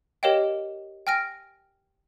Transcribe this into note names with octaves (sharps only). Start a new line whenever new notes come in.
G4 A#4 C#5 D#5 F5 G5
G5 G#5 F6 A#6 D7